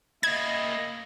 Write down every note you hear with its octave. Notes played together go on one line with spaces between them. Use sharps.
A#3 E4 D#5 G#6